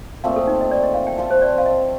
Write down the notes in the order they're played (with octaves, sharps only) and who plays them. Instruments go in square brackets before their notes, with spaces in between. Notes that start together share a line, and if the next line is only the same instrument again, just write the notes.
[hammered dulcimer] A#2 A3 C4 [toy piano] F5
[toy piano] A4
D#4
D#5
D5
D#5
F5
G5
[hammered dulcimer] F3 C4 F4 A4 [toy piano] F5
[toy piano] C5
D5
F5
D#5